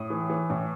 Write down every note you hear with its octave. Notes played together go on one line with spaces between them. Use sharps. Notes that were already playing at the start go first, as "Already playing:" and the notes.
Already playing: A2 D#6
E3
E3
A2